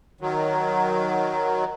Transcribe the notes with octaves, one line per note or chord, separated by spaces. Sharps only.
D#3 F#3